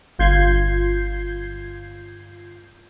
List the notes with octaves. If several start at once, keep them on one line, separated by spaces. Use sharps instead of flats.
G1 F4 G6 G#6 C7